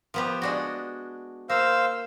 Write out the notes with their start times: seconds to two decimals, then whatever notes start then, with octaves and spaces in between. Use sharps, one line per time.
0.14 F3 B3 G4
0.42 G#3 D4 F#4
1.49 A#3 C5 F5 E6